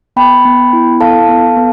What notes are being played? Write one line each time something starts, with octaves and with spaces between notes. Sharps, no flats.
B3 G5 B5
B3
E4
A4 F5 A5
B3
B3